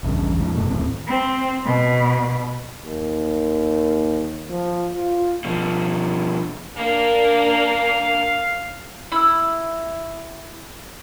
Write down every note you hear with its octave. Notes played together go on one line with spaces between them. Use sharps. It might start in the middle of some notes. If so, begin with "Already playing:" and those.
A#1 E2 G2 C#3
E2 G#2 F3
F1 F#2 B2 A3
D#1 D#2 A2 C4
C4
B2
D#2
F3
F4
B2 F3
A#3 D4 F5
E4 E6